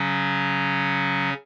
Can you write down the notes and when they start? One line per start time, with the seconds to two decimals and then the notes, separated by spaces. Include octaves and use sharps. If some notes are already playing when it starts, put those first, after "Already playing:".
Already playing: C#3 F#3 C#4